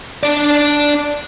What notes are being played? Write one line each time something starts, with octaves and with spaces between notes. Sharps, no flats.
D4 D5